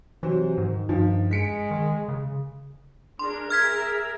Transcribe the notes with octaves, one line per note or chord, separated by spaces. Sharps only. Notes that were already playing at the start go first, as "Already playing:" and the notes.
C3 E3 F#3 C5
G#2 D#3
G2 F3
G#3 B6 C#7 D7
D#3
C#3
D4 G#4 A#4 C6
G#4 A#4 E5 F6 G#6 B6